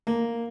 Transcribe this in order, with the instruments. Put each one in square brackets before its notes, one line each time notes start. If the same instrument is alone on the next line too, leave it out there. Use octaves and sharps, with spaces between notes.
[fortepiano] A#3